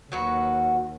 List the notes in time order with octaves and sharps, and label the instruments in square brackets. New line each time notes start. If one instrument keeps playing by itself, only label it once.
[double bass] D#2 [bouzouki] F#3 F#4 B4